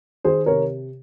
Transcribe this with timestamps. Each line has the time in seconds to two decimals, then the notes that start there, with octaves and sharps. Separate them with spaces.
0.25 D#3 G#4 C5
0.46 C3 A#4 C#5